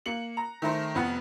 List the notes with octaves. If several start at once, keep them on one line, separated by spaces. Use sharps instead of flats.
A#3 C#7 F#7
A#5
D#3 A3 A#4 C5
F1 F2 B3 F#5